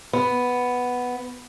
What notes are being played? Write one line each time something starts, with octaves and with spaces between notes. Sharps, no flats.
B3